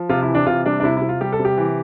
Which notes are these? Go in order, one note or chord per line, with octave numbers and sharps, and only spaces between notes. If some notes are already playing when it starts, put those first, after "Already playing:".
Already playing: F3
C3 F4
E4
E3
D4
C3 F4
G3 D4
D4
C3 E4
E4
C3
F4
G3 G4
A4
C3
G4
E3